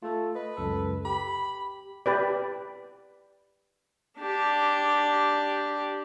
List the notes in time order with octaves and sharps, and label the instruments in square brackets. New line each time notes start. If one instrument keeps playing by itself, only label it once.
[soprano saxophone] A3 [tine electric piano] F4 A4
[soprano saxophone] B4 [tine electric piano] D#5
[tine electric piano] C#2 F#2 A4
[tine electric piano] G4 [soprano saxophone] B5
[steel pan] G4 B4 D5
[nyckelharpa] D4 G4